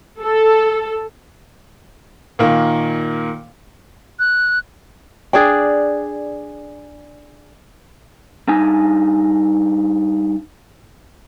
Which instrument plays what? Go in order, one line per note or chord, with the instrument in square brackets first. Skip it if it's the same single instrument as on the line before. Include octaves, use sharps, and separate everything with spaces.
[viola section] A4
[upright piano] A#2 D#3 A#3
[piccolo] F#6
[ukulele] D4 G#4 D5 G5
[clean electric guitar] G2 D4 D#4 G#5